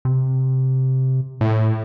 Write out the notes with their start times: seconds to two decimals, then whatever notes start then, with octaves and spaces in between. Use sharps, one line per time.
0.05 C3
1.41 A2